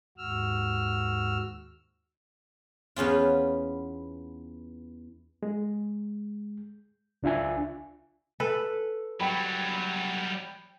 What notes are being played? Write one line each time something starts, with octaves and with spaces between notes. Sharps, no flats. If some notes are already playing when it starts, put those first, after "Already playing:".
D#2 G#2 F#4 E6 F6
E2 B3 C#4 F4
G#3
C#2 D4 F4 E5 G#5
A4 B4
F#3 G3 G5 B5